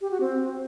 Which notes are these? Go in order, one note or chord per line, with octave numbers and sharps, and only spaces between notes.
G4
F#4
C4